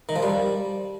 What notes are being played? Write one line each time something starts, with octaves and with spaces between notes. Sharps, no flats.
D#3
F3
G3